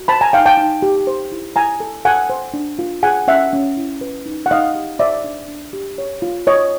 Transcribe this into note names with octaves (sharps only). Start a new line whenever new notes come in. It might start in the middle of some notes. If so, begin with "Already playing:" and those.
Already playing: F#4
C5 A5 B5
G#5 A#5
D#4 F5 G5
G5 A5
D#4
G4
C5
E4
E4 G#5 A#5
A4
A4 F#5 G#5
C5
D4
F4
G#4 F#5 G#5
C#4 E5 F#5
C#4
E4
B4
D#4
F#5
D#4 D#5 F5
G4
C5 D5 E5
D4
D4
G4
C#5
F4
F4 C#5 D#5